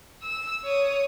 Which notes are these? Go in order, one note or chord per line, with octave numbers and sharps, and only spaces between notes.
E6
C#5 D#6